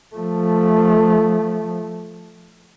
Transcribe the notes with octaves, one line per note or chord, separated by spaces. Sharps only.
F3 A3